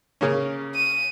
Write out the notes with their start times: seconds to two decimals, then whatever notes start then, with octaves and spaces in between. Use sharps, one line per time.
0.21 C#3 A#3 C#4
0.75 D#7